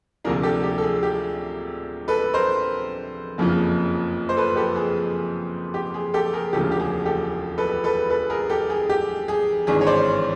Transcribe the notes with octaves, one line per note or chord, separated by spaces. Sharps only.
D2 C3 F3 A#3 D4 G#4 A#4
G4 A4
G4
A4
G#4
G4
A4 B4
A#4 C5
F#1 F2 C#3 F3
C5
A4 B4
G4 A4
G#4
G4
G#4
G4 A4
G#4 A#4
E1 D2 C#3 F3 A#3 G4 A4
G4
G#4
G4 A4
A4 B4
A4 B4
A4 B4
G#4 A#4
G4 A4
G#4
G4
G#4
G#1 G2 E3 G#3 G#4
C#5
C5 D5